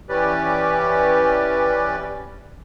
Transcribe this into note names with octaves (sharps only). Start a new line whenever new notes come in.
E3 C#4 G4 B4 D5